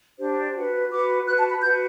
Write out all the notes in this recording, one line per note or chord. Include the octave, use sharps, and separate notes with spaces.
D4 G4 C5
F#4 B4
F#4 B4 D6
F#4 B4 F#6
A5
B5
F#4 B4 G6